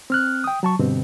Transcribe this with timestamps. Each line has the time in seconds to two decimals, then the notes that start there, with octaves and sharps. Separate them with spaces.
0.10 C4 F6 F#6
0.44 G5 D#6
0.63 F#3 A5 C#6
0.79 G2 B2 D3 C4